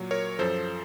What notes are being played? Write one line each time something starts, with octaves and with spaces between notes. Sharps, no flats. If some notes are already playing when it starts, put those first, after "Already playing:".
Already playing: A#2 F#3
A#4 C#5
F#2 F3 A4 C5